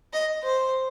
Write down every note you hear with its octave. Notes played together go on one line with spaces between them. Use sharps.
D#5
C5